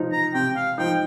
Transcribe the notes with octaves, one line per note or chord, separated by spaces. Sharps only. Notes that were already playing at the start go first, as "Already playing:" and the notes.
Already playing: F3 D#4
A#5
C3 G5
F5
F3 D#4 G5